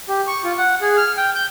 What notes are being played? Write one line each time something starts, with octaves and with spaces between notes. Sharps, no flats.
G4
C#6
F4
F#5
G#4
F6
G5
G6